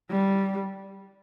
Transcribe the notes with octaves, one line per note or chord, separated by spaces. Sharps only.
G3